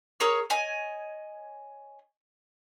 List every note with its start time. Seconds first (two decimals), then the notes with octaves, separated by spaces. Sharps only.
0.20 G#4 A#4 C#5 E6
0.50 C#5 D#5 G#5